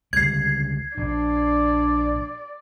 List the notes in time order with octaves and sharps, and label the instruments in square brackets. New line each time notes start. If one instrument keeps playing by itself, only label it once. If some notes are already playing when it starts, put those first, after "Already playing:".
[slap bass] C#2 D3 G3 [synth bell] G#6 C7
[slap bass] A#1 [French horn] D4 [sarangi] D5